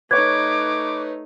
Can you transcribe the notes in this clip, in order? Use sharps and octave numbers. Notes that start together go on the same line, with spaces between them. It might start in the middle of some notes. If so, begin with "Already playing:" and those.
A3 D#4 B4 C#5 D6 G#6